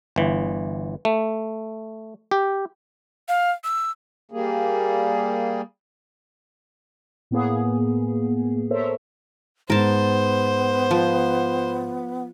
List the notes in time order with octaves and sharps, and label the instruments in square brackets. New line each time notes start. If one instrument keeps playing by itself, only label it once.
[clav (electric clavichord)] G1 E3
A3
G4
[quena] F5
E6
[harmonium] G3 A#3 G#4
[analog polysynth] A2 A#3 B3 G#4
A4 A#4 C5 C#5 E5
[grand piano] G#2 [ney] B3 [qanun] A#4 A5 [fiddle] C5
[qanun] F3